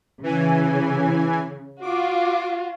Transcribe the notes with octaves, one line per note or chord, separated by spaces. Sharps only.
C#3 E3 G#5
F4 F#4 D6